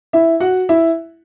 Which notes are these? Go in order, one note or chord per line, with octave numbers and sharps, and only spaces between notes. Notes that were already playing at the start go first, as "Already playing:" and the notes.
E4 E5
F#4 F#5
E4 E5